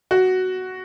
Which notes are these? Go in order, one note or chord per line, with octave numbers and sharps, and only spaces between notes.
F#4